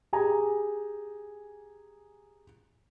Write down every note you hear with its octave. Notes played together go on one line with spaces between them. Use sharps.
G4 G#4 G#5 A#5